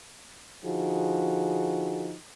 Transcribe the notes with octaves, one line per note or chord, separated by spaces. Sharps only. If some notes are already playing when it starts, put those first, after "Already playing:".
D3 F3 D#4 F#4 G#4